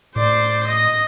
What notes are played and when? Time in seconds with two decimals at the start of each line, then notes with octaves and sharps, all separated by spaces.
0.16 A2 C5 D5
0.67 D#5